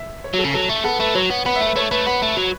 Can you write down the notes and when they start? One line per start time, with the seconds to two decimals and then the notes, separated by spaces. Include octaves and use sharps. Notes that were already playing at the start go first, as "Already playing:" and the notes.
Already playing: E5
0.24 C#5
0.34 F#3
0.39 A4
0.44 C#3
0.54 F#3 A4
0.69 A3
0.84 B3 A4
1.00 A3 B4
1.15 F#3 C#5
1.30 B3
1.46 B3 B4
1.55 E5
1.61 A3
1.66 B4
1.76 A3 C#5
1.91 A3 B4
2.06 B3 B4
2.22 A3
2.37 F#3